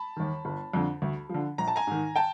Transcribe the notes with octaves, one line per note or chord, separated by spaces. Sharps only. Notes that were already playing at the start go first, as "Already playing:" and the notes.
Already playing: A5 B5
D#2 D#3
G1
F2 D3
D2
D3 F3
A#1 A#5
A5
G#5 A#5
G#2 D#3
G5 A5